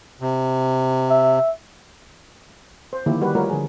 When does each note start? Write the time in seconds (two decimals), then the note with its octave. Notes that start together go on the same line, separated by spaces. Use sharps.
0.21 C3
1.10 E5
2.93 C5
3.06 D3 D#3 F3 A#3 E4 G4
3.21 G3 F#4 G4 B4
3.35 G3 A3 F4 F#4 A#4 C#5
3.49 D3 F3 G#4